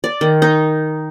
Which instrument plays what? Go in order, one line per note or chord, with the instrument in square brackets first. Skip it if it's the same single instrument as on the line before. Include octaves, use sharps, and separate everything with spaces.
[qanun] D5
D#3
D#4